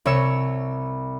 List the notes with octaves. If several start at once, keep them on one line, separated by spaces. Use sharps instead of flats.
C2 C#5 E6 C#7